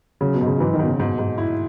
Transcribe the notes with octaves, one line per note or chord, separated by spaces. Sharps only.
C#3 F#3
B2
G#2
C#3
F#3
G#2 E3
D#3
G#2 B2
C#3
G#2 B2
G#2
E4